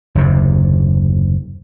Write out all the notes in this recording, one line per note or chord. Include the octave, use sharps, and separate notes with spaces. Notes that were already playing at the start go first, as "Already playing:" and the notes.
F#1 D#2 C3